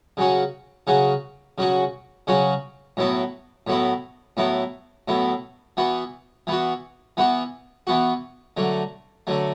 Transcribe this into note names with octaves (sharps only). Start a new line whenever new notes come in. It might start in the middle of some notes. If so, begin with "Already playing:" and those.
C#3 F#3 C#4 F#4
C#3 F#3 C#4 F#4
C#3 F#3 C#4 F#4
C#3 F#3 C#4 F#4
A2 F#3 B3 E4
A2 F#3 B3 E4
A2 F#3 B3 E4
A2 F#3 B3 E4
E3 B3 F#4
E3 B3 F#4
E3 B3 F#4
E3 B3 F#4
D3 F#3 A3
D3 F#3 A3